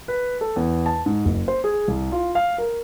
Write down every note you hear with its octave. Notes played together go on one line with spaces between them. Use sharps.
B4
A4
E2
A5
G#2
F#1
C5
G#4
C2
F4
F5
A#4